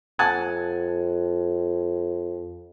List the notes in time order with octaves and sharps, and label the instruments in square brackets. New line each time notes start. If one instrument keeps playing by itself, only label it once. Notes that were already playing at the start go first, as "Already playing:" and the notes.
[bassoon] F2 [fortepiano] F#5 G#5 A5